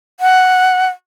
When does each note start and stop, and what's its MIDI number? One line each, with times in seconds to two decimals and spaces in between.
0.20 0.87 78